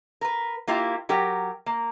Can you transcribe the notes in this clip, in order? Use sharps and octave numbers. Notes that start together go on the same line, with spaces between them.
A#4 B4
A#3 E4 F4 G4
F#3 G4 A#4 G5
A#3